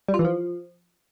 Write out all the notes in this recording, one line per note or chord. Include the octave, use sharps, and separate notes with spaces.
G3
F4
E3
F3